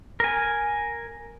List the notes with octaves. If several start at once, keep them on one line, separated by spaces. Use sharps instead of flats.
A#4 G#5